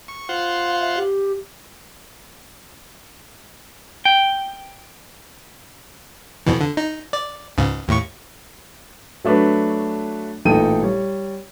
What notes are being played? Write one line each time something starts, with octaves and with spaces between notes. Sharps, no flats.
C#6
F4 C5 F#5
F5
E5
G4
G5
F2 B2 E3
D3
D#4
D5
C#2 G#2 C#3
D#2 A2 C#6
F#3 A3 D4 F#4 B4
A1 A#2 D#4 A4 G5 D#7
G3 C#5